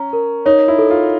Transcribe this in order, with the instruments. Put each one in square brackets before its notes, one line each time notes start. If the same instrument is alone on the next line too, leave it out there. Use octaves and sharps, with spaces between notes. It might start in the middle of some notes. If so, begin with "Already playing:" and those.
Already playing: [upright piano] C#4 [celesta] C#5 A#5
[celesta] A#4
[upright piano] D#4 [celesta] C#5
[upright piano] E4
[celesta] A4
[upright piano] F4